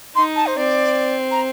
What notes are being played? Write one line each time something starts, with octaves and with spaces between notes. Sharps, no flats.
D#4 C6
A5
C5
C4 D5
A#5